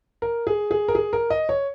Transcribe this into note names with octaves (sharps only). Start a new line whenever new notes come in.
A#4
G#4
G#4
A#4
G#4
A#4
D#5
C#5